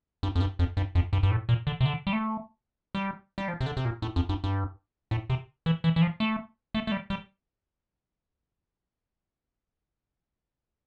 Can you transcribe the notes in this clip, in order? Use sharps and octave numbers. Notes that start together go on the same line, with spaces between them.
G2
F2
G2
F2
G2
F2
G2
G2
A2
A#2
D3
C3
D3
G3
A3
G3
G3
F3
C3
D3
C3
A#2
A2
F2
G2
G2
A2
C3
E3
E3
E3
F3
A3
A3
A3
G3
G3